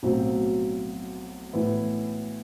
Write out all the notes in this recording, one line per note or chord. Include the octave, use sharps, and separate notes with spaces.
B1 A2 F#3 C4
A2 E3 B3 E4